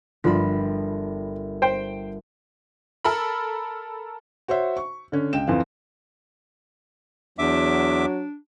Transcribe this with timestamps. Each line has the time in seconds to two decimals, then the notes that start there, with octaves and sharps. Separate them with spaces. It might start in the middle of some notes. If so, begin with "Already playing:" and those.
0.24 G1 D3 F3 G3 A#4 E5 B5
1.62 C5 G5
3.04 A4 A#4 B5
4.48 F#4 C5 C#5 E5
4.77 C#6
5.12 D3 C#4
5.33 C#2 G5 E7
5.47 F2 E3 F3 C4 F5
7.39 E2 F#3 D4 E5 D6